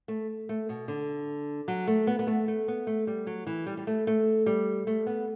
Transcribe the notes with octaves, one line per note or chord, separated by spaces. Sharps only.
A3
A3
B2
D3
F#3
A3
B3
B3
A3
A3
B3
A3
G3
F#3
E3
G3
G3
A3
A3
G3
A3
B3